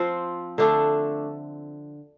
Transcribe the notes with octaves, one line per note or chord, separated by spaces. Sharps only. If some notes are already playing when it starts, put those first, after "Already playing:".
Already playing: F3 C4 F4 C5
D3 A3 D4 A4